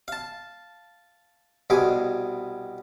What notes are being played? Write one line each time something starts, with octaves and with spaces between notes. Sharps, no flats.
F5 A5
C2 B2 G#4 D6